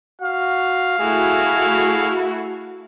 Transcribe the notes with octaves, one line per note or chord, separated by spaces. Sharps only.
F#4 F5
A3 E4 F#4 G#4